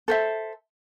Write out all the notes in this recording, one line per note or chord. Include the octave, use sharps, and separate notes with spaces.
A4 C5 E5